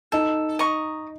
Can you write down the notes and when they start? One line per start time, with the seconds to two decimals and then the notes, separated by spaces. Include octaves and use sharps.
0.12 D#4 A4
0.59 D#5 A#5 C#6